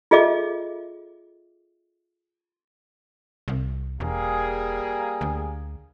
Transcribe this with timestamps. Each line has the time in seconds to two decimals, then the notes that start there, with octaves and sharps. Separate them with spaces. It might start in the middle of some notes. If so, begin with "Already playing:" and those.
0.11 F4 G#4 A4 D#5 E5 D6
3.48 C2
4.00 E1 G3 A#3 G#4
5.21 D2